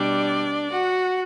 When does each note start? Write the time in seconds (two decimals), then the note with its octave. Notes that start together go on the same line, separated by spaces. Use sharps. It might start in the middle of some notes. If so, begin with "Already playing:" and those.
Already playing: B2 G3 D4 D5
0.69 F#4 F#5